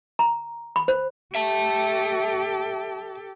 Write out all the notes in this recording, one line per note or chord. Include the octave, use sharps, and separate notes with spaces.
A#5
B5
C5
G4 A4 E5 A5